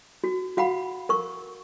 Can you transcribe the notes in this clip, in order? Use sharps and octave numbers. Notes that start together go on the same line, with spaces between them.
F#4
F#4 F5 F#5 B5
A#4 C#6